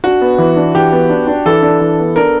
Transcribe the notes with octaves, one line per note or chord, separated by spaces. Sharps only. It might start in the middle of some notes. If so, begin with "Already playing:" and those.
D4 F#4
B3
E3
D4
E3 G4
B3
D4
D4
E3 A4
D4
E3
B3
D4 A#4